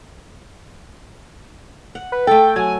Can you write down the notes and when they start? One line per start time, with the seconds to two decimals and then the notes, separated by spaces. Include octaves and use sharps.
1.95 F#5
2.12 B4
2.27 A3 A4 G5
2.56 F#3 G#5